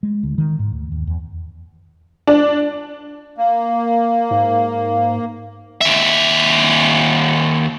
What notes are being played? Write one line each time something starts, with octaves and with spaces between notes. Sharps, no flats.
G#3
D2
D#3
G#2
D2
D#2
E2
D4
A#3
G#2
D#2 E5